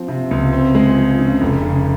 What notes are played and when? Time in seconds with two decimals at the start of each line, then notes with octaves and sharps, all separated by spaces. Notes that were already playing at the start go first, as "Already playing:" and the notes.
Already playing: F3 C4
0.08 C3
0.31 C#2
0.53 C4
0.75 G#3
0.97 F3
1.19 C#3
1.41 F1
1.63 C#3